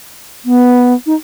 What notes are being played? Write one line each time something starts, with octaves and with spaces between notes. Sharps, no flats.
B3
D#4